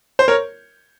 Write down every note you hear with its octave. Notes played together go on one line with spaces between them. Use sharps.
C5
A#4 C#5